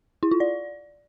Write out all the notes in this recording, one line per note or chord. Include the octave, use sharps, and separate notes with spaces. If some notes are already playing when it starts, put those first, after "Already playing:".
E4
F4
D5